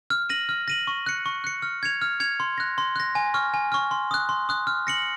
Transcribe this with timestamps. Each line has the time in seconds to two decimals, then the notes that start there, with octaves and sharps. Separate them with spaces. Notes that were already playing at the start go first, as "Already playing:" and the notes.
0.10 F6
0.29 A#6 D#7 F#7
0.49 F6
0.68 A#6 D#7 F#7
0.87 C#6
1.06 F#6 C#7
1.26 C#6
1.44 F#6 C#7
1.62 F6
1.83 G#6 C#7 F7
2.02 F6
2.20 G#6 C#7 F7
2.40 C6
2.58 F#6 A#6
2.78 C6
2.96 F#6 A#6
3.15 G#5
3.34 C#6 F6
3.54 G#5
3.72 C#6 F6
3.91 C6
4.11 D#6 F#6
4.29 C6
4.49 D#6 F#6
4.67 F6
4.87 A#6 C#7 F#7